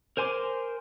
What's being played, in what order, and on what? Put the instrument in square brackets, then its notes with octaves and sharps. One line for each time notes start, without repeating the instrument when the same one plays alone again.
[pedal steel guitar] A#4 C5 G#5 C6 D6